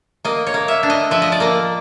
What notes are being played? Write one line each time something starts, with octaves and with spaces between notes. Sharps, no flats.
A#3 D#5
C#5
A#3
E5
D4
D#5
F3 E5
D#5
D5
A#3 D#5